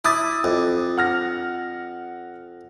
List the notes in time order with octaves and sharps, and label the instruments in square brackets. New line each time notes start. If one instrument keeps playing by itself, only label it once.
[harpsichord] E4 [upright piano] D6 D#6 A6
[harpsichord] F2
[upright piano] F#5 F6 A#6